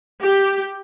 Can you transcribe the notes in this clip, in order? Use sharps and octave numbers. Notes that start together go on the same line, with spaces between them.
G4